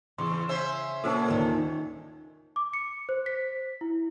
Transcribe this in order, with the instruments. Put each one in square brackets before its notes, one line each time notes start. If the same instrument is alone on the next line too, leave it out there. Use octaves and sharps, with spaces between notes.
[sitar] E2 [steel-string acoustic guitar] C#3 [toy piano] C6 C#6
[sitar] C#4 C5 E5
[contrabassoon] A#2 [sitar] A#3 C#4 [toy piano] A4 C5 A5
[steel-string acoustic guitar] D2 D#3 [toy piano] A#4
[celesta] D6
C#7
C5
B6
E4